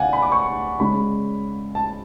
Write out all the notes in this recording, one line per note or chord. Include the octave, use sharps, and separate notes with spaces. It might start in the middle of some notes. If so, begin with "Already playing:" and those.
Already playing: C#3 D5 F5 F#5 G#5
B5
D6
C#6
C#3 G#3 C#4 B5
A5